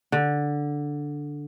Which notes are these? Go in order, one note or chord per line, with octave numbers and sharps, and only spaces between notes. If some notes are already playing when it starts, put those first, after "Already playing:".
D3